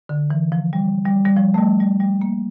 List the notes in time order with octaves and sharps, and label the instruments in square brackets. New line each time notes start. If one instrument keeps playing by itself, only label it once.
[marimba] D3
E3
F3
G3
G3
G3
F3
A3
G3
G3
G3
A#3